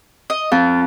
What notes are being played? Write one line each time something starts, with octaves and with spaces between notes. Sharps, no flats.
D#5
F2 F4